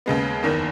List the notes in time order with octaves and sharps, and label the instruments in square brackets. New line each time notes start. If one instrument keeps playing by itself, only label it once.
[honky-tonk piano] D#2 C#3 G#3 B3
F#1 E2 D#3 A#3